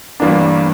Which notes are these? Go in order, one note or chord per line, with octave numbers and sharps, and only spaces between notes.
G1 G2 E3 A#3 D4